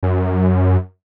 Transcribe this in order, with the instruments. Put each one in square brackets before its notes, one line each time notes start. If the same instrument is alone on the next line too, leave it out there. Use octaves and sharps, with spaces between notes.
[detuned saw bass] F#2